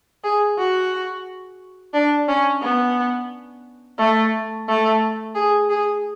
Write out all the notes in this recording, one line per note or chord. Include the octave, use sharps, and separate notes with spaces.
G#4
F#4
D4
C#4
B3
A3
A3
G#4
G#4